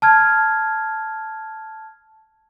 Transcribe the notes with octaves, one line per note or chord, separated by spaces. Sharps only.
A5 F6 G#6